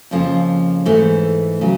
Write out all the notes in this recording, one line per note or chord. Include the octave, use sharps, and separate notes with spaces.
F2 C#3 F3 A#3
G#2 E3 A3
C#3 F#3